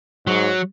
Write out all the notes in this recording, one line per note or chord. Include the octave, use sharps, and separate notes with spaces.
G#2 F#3